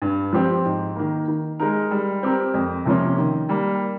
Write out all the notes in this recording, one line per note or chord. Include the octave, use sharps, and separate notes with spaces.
G2
F3 C4 G4
G#2
D#3 A#3
D#3
G#3 D#4 A#4
G3
C4 G4 A#4
F2
C3 F3 A#3 C#4
D#3
G3 A#3